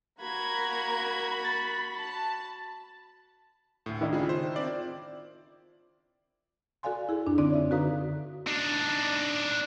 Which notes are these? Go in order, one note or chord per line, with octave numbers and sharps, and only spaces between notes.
A#3 F#4 A#5 B5 G#6
A6
A5
D2 A2
D#3 D4 E4
C#3 F4 G#4
C5
C4 D5
F#4 A4 D5 F5 G#5 C6
E4 G#4
F#2 D4
D3 C4 D#4 D5 D6
C#5 E5
F#4 A4 B4 F5 A#5 D#6
D4 D#4